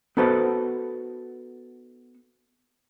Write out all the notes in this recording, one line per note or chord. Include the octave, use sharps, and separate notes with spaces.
B3 D#4 F#4 A4 B4 C5